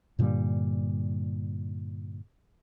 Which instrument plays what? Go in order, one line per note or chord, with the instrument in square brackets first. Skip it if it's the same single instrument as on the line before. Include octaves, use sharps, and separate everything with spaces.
[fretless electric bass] G2 A#2 D3 G3